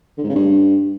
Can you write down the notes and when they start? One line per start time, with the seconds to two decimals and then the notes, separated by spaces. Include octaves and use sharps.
0.18 D3
0.24 G#2
0.29 C#3
0.35 G2